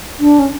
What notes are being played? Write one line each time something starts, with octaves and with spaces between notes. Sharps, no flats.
D4
C#4